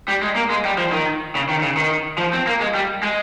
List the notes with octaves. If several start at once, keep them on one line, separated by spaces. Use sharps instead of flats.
G3
G#3
A#3
G#3
G3
F3
D#3
C#3
D#3
C#3
D#3
F3
C4
A#3
G#3
G3
G#3